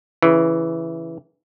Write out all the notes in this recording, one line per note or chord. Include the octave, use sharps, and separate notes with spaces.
C#3 E3